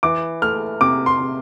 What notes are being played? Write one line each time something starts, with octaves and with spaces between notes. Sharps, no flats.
E3 D6
A3 F6
C3 D6
C6
C3